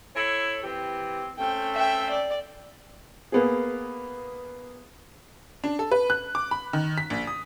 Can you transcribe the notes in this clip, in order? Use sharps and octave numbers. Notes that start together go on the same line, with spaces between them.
E4 A4 C#5
E3 C4 G4
A3 C4 C#4 G5
E5 G5
D5
A#3 B3 G#4
D4
A4
B4
F#6
D6
B5
D#3
B6
A#1
D#6